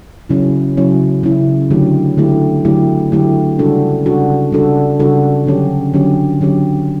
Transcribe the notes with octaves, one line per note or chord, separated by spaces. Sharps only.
C#3 F#3 C#4 E4
C#3 F#3 C#4 E4
C#3 F#3 C#4 E4
D3 F#3 A3 E4 G4
D3 F#3 A3 E4 G4
D3 F#3 A3 E4 G4
D3 F#3 A3 E4 G4
C#3 G3 D4 F#4 A4
C#3 G3 D4 F#4 A4
C#3 G3 D4 F#4 A4
C#3 G3 D4 F#4 A4
D3 F#3 C#4 G4
D3 F#3 C#4 G4
D3 F#3 C#4 G4